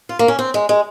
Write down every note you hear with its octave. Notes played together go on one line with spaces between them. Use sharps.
F4
A#3
C#4
C4
G#3
G#3